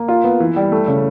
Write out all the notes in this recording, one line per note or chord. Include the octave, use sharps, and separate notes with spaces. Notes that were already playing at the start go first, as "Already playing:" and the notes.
Already playing: A#3
F4
B3
E3
G3
A3
C#3